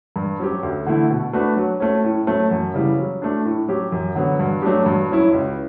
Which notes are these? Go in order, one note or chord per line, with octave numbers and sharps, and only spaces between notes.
G2
F#3 C#4 G4
D2
D3 A3 E4
B2
A3 D4 F#4 B4
F#3
A3 C#4
A2
F#3 A3 C#4
F#2
C#3 E3 G3
F#3
A3 D4
A2
F#3 C#4 G4
F#2
D3 F#3 B3
G2
F#3 A3 D4 G4
G2
F#3 C#4 E4
C#2